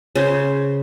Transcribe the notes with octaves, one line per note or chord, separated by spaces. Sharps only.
C#3 C5